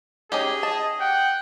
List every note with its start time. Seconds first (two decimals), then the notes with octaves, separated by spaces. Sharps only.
0.32 C#4 D#4 G4 G#4
0.63 D#5 A5
1.00 F#5 G5